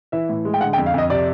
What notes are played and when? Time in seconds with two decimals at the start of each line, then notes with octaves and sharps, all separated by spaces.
0.12 E3 E5
0.29 A2
0.45 G#3
0.54 G5
0.61 D3 F#5
0.73 G5
0.78 F2
0.86 F5
0.94 F2 D#5
1.10 C3 D5